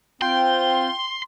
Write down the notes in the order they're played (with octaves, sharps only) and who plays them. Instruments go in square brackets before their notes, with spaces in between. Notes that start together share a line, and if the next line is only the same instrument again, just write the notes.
[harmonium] C4 [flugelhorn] F4 [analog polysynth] G5 [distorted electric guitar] C6